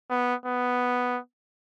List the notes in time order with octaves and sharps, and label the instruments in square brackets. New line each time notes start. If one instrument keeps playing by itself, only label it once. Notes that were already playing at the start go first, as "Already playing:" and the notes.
[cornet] B3
B3